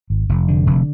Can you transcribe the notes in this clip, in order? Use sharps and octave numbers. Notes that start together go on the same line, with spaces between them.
G#1
F1
D3
F1